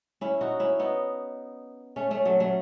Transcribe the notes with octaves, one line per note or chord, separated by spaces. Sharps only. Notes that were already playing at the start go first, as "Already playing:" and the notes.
C#4 E4
D#4 F#4
C#4 E4
B3 D#4
A3 C#4
A3 C#4
F#3 A3
F#3 A3